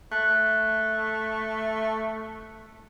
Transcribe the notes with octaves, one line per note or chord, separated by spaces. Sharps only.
A3 F#6